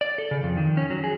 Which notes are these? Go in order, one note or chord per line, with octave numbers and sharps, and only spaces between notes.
D5
A4
C#3
F2
D#3
C#4
F#3
G#4